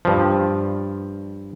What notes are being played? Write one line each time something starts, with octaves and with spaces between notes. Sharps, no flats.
G2 F3